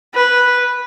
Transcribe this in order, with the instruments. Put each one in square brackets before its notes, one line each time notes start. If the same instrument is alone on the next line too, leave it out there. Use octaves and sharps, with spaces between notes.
[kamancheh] B4